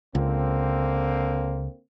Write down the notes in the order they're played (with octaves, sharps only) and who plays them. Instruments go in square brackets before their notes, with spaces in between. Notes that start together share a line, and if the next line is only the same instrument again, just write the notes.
[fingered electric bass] C#2 [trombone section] D3 A#3 C4